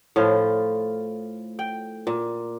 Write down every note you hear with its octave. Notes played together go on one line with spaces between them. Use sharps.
A2 F3 F4
G5
A#2